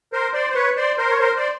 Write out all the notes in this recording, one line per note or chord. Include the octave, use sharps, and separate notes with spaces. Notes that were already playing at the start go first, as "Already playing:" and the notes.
A#4 C5
C5 D5
C5
B4 C#5
C5 D5
A#4 C5
C#5
A#4 C5
C5 D5